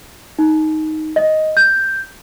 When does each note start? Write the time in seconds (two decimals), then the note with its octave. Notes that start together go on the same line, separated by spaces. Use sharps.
0.39 D#4
1.16 D#5
1.57 G6